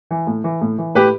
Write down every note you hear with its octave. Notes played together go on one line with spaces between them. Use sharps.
E3
A2
E3
A2
E3
A2 G4 B4